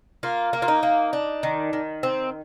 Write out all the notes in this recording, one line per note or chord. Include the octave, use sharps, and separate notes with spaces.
A#3 F4
A#3
F4
D#4
A#3
D4
D#3
D#3
C4